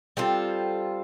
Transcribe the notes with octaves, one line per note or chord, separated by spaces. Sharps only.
G3 C4 F4 A4